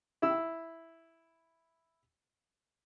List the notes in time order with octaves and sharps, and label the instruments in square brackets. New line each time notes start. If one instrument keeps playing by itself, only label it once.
[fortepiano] E4 E6